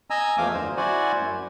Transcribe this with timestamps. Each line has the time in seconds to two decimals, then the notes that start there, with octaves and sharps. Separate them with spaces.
0.10 D#5 G#5 A#5 E6
0.38 E2 F3 A3 F5 D6
0.53 F#2 D3 C5
0.77 E4 F#4 C5 D5 F#5 G#5
1.18 F#2